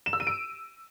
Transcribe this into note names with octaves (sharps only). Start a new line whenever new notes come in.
E7
E6
D#7
D7